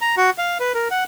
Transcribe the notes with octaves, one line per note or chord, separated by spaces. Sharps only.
A#5
F#4
F5
B4
A#4
F#5